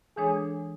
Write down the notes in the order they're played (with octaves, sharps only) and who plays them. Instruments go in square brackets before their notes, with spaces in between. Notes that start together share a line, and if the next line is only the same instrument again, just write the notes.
[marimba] E3 G#3 D4 A4 C#5 [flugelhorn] G#4